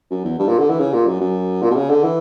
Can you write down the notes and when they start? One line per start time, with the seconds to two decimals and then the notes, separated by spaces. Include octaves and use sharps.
0.11 F#2
0.25 E2
0.39 G2
0.49 A#2
0.59 D3
0.69 E3
0.80 C#3
0.93 A#2
1.07 F#2
1.20 F#2
1.62 A#2
1.71 B2
1.76 C#3
1.90 D3
2.03 E3